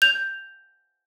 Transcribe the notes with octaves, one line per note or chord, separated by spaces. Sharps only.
G6 F7